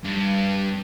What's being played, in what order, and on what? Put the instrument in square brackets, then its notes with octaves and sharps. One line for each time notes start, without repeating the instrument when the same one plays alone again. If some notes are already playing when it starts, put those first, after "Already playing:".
[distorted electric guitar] G2